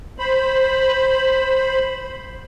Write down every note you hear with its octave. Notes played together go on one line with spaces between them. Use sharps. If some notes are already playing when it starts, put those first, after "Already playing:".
C5 B5